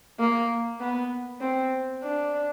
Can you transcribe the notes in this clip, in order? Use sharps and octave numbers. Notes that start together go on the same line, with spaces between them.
A#3
B3
C4
D4